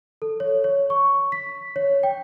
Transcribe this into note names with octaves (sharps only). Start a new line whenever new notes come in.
A4
C#5
C#5
C#6
B6
C#5
G5